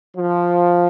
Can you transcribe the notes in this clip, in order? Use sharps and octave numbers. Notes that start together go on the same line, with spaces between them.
F3